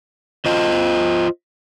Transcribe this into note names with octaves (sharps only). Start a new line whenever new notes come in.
F4 C5 D#5